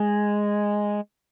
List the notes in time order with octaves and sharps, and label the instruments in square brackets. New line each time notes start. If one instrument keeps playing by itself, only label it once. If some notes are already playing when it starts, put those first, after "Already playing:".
Already playing: [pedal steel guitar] G#3